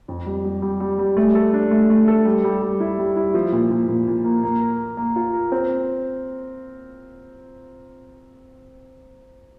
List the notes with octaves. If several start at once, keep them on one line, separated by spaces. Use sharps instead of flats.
F2
G3
G3
G3
G3
G3
A3
A4
D4
A3
A3
A4
G3
G3
G3
E4
G3
E4
F3
A#2
A#2
A#2
A#2
A#3
A#3
A#4
A#4
A#3
F4
A#4
C4